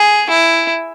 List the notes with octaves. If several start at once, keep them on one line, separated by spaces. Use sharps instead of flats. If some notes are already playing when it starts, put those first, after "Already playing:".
Already playing: G#4
E4